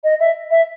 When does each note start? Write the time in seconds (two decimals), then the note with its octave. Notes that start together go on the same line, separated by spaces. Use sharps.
0.04 D#5
0.20 E5
0.51 E5